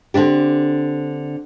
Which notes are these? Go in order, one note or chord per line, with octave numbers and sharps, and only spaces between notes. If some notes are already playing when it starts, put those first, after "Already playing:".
D3 C4 D4 G4